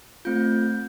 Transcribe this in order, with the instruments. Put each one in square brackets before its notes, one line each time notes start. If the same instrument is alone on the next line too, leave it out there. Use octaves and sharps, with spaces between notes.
[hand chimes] A3 C4 F4 G6